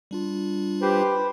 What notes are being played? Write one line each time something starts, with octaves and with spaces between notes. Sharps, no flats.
G3 D4 F4
G4 B4 C5